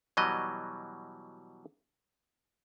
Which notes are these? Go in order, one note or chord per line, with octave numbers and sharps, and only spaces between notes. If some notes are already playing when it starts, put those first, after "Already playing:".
B2 E3 F#3 G3 D#5